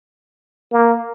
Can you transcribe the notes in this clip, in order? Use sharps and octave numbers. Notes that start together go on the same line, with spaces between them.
A#3